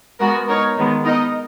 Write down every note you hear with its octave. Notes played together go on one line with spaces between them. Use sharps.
G#3 B3 F#4 A#4
B3 D#4 A#4 C#5
D#3 G#3 B3
B3 D#4 A#4 D#5